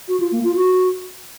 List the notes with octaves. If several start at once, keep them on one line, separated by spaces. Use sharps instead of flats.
F#4
F4
A#3
F4
F#4